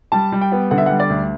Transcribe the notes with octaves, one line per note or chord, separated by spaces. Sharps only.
G3 A5
G3
G5
B3
D3 F#5
E5
G3 F#5
D5
D2